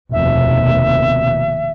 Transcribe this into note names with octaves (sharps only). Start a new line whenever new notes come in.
F1 D#2 B2 E5